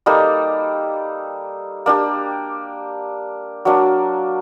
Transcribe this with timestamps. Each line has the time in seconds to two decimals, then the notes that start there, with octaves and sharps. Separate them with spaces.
0.06 G3 A#3 D#4 A4
1.86 A#3 D4 G4
3.65 F#3 A#3 D4